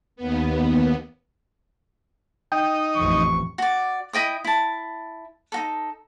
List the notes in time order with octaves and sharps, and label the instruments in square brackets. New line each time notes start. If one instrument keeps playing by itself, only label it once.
[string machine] D#2 B3
[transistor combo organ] D#4 [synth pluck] G5
[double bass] A1 F2 [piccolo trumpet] C#6
[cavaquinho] F#4 D5
E4 D#5 G5 D#6
E4 A5
D#4 F#4 A4